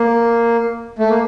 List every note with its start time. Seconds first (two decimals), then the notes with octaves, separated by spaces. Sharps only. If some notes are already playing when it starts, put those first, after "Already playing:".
Already playing: A#3
0.99 A3
1.09 A#3